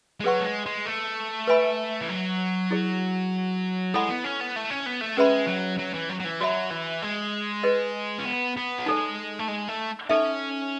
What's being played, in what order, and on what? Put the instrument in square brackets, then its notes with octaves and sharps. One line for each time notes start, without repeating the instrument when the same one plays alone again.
[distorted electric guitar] G#3
[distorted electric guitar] F#3 [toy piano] G#4 B4 F#5 C#6
[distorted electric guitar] A3
G#3
G#3
A3
[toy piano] B4 E5 G#5 B5
[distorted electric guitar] E3
F#3
[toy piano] E4 G#4 C#5
[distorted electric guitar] G#3 [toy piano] E4 A4 C#5 F#5 B5
[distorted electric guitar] B3
C#4
B3
A3
C#4
B3
A3
[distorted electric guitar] G#3 [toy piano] C#4 G#4 B4 E5 B5
[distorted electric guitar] F#3
F#3
E3
F#3
F#3
E3
[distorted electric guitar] F#3 [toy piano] F#4 C#5 E5 B5
[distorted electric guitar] E3
G#3
[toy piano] G#4 B4 D#5
[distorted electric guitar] C#4
B3
B3
F#3
[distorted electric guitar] G#3 [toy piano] D#4 A4 C#5
[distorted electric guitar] A3
G#3
A3
[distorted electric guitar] C#4 [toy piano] D#4 A4 E5